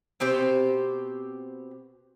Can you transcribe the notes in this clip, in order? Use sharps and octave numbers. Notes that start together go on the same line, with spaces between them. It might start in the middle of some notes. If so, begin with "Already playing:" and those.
B2 C4 G4 C5